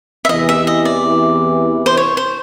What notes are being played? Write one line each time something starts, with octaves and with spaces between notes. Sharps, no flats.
E5
E2 C3 E3 D#5
E5
D#5
D5
C5
C#5
C5